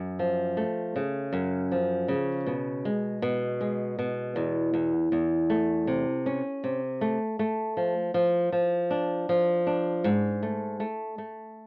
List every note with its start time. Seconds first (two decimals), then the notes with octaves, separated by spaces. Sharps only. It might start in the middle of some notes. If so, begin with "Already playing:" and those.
Already playing: F#2
0.19 F3
0.57 A3
0.96 C#3
1.33 F#2
1.72 F3
2.08 C#3
2.46 B2
2.85 G#3
3.22 B2
3.61 G#3
3.99 B2
4.36 E2
4.74 E2
5.12 E2
5.50 A3
5.87 C3
6.26 C#4
6.64 C3
7.01 A3
7.39 A3
7.77 F3
8.14 F3
8.52 F3
8.91 D4
9.29 F3
9.67 D4
10.04 G#2
10.43 A3
10.80 A3
11.18 A3